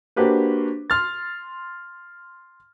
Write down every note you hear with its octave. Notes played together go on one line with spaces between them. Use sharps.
A#3 D4 F#4 G4 B4 C5
C6 F6 A6